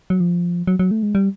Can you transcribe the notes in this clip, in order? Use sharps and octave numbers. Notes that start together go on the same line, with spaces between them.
F#3
F3
F#3
F#3
A3
G#3
G3